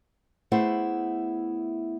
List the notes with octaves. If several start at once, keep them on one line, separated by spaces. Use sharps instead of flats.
A3 B3 E4 G#4 C5 F#5